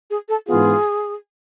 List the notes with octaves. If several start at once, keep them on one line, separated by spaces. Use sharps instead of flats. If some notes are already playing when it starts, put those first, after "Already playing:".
G#4
A4
G#2 E3 B3 F4 G#4